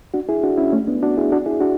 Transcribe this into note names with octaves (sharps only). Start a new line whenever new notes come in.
D4 F#4
E4 G#4
D4 F#4
C#4 E4
A3 C#4
B3 D4
D4 F#4
E4 G#4
D4 F#4
E4 G#4
D4 F#4